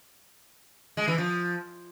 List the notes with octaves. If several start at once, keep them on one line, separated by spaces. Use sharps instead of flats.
G#3
E3
F3